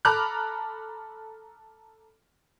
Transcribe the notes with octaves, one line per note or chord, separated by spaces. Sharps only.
A4 A#5 B5 D6 F6 F#6